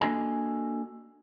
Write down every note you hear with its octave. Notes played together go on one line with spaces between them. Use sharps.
A#3 D4 F#4 A4 D#5 G#5